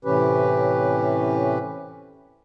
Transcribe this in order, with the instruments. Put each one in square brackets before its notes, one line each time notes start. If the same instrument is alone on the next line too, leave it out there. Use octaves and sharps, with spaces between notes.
[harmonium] A2 C3 E3 C#4 G4 B4